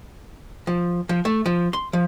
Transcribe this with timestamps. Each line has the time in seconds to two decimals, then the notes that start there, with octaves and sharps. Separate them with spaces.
0.67 F3
1.09 F3
1.25 A3
1.46 F3
1.73 C6
1.93 F3